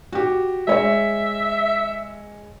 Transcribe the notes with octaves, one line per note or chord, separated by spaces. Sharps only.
F#4 G4
G#3 C#5 E5